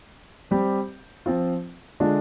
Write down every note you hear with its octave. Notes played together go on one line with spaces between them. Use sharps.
G3 C4 G4
F3 C4 F4
D3 G#3 D4 F4